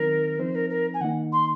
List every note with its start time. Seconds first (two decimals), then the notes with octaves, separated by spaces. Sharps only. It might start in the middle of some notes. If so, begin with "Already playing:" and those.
Already playing: D#3 F#3 C4 D#4 A#4
0.39 F3 C4 D#4 C5
0.55 A#4
0.70 A#4
0.94 G#5
1.01 D#3 A#3 D#4 F#5
1.33 C6